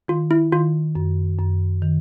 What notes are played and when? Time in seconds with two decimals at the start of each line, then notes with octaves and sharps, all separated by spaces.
0.08 D#3 F4
0.31 E4
0.52 D#3 F4
0.95 F#2
1.39 F#2
1.82 D#3